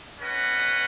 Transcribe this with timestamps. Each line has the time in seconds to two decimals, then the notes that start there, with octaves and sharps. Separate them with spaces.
0.20 C#4 B4 D#5 F#5